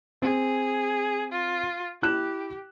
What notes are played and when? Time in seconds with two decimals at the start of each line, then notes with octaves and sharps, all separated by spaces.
0.22 C4 G#4
1.32 F4
2.02 E4 G4 F#6 E7